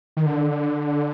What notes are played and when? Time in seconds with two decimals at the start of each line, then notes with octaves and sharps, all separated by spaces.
0.17 D#3
0.26 D3